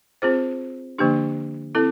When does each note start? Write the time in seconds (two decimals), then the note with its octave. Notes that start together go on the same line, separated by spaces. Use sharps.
0.22 C4 F4 G#4 C5
0.98 D3 F3 A#3 D4 G4
1.75 C4 E4 A4